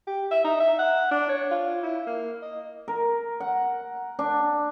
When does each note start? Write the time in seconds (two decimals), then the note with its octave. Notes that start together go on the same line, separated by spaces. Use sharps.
0.07 G4
0.31 E5
0.44 D#4
0.60 E5
0.79 F#5
1.11 D4
1.29 C#5
1.51 F4
1.83 E4
2.07 A#3
2.42 D#5
2.88 A#4
3.40 F#5
4.19 D4